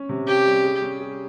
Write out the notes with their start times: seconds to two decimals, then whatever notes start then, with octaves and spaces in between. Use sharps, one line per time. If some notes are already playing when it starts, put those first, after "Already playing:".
Already playing: C#4
0.09 C3
0.27 C#4 G4
0.46 G3
0.64 G#4
0.82 C#4
1.00 G#4